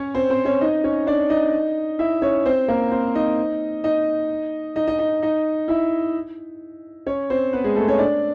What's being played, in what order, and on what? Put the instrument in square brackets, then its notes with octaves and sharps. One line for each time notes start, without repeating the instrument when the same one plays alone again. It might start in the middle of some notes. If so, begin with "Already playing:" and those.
Already playing: [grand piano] C#4 C#5
C4 C5
C4 C5
C#4 C#5
D#4 D#5
C#4 C#5
D4 D5
D#4 D#5
E4 E5
C#4 C#5
C4 C5
A#3 A#4
C4 C5
D#4 D#5
D#4 D#5
D#4 D#5
D#4 D#5
D#4 D#5
D#4 D#5
E4 E5
C#4 C#5
C4 C5
B3 B4
G#3 G#4
A3 A4
C#4 C#5
D4 D5